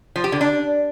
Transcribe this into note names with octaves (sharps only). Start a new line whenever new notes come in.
F3
G4
D3
D4